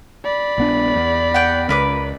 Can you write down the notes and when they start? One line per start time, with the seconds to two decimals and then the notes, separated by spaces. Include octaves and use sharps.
0.25 D5 B5
0.58 A#1 B3 D4
0.95 E2 B3
1.34 F#5 G5
1.69 C#2 A#4 B4 D6